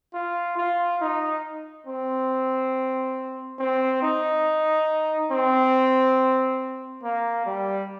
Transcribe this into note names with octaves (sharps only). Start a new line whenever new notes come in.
F4
F4
D#4
C4
C4
D#4
C4
A#3
G3